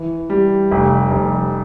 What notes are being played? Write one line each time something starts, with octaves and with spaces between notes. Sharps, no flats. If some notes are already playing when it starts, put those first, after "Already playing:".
Already playing: E3
G3
F1
F1